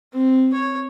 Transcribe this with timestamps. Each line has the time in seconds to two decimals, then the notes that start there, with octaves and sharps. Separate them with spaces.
0.13 C4
0.53 C#5